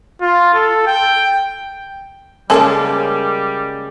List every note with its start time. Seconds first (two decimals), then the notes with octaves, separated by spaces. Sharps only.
0.22 F4
0.54 A4
0.87 G5
2.50 C#3 G3 G#3 A#3 C#4 A4